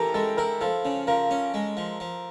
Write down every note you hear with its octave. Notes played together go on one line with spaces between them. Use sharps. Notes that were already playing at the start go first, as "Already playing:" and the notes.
Already playing: E3 G4 A4 A#4
G#3 A4
E4 A#4
F3 A4
C#3
F3 A#4
C#4
G#3
F3
F3